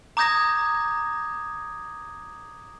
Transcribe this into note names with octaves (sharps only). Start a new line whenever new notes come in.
A#5 D6 D#6 G6 G#6 A#6